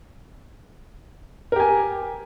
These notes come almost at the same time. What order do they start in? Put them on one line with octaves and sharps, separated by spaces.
A#4 G4 G#5